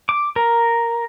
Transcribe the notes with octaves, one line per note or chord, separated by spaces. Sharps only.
D6
A#4